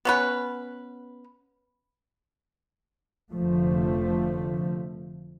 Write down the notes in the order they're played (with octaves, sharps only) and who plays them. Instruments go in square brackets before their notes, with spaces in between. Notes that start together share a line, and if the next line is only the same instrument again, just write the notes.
[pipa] B3 C#4 B4
[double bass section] F1 F2 D3 F3 A3